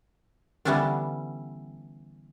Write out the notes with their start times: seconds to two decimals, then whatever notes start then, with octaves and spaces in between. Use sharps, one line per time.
0.65 D3 E3 G3 B3 C#4 D4